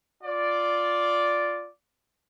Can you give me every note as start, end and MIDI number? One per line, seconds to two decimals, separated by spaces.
0.24 1.68 65
0.24 1.68 74